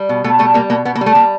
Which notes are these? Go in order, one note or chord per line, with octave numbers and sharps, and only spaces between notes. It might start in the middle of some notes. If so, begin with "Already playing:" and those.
Already playing: G3
B2
B2 A3
G3 A3
G3 A#3
B2 A#3
B2 B3
A#3
G3
A3
G3 A#3